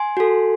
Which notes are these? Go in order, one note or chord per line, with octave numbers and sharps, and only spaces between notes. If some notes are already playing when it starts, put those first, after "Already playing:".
Already playing: G#5 C6
F#4 A4